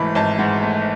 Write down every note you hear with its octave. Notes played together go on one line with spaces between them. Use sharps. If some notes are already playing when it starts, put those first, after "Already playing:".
Already playing: G#1 G#2 E3 A3 B5
G#1 A5
G#2 F#5
A3